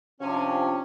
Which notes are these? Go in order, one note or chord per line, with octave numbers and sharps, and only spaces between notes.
C3 F3 C#4 D4